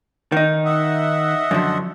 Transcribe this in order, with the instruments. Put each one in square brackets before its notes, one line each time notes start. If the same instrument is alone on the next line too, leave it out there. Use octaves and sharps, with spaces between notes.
[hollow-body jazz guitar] D#3 D#4
[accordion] D#5 E5 F#5
[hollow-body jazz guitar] F#2 D3 F3